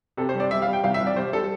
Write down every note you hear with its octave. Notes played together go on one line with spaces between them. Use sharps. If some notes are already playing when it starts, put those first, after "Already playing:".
C3 A4
C5
G3
D5
G3 E5
F5
G3
G5
C2 F5
E5
C2
D5
G3 C5
G3 A4